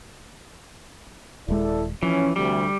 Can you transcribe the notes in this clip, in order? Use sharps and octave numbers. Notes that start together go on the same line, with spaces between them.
D#1 G#3 E4 A4 D5
E3 F3 C#4
D2 C3 G3